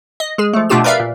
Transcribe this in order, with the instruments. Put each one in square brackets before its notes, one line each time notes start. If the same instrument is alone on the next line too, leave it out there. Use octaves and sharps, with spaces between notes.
[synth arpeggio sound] D#5
G#3 G#4
F3 A3
B2 A3 D4 F4 G4 E7
A#4 B4 D5 E5 F5
A#2